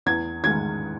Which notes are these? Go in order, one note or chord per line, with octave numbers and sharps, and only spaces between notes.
E2 G#6
D#3 G#3 G#6